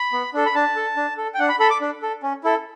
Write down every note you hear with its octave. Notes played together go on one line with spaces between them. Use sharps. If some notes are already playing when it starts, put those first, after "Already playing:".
Already playing: B5
B3
D4 A4
B5
D4 A5
A4
D4
A4
G5
D4 F#5
B5
A4 B5
D6
D4
A4
C#4
E4 A4